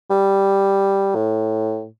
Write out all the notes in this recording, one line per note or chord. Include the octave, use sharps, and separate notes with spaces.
G3
A2